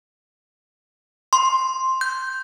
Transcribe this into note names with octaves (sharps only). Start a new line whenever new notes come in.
C6
G6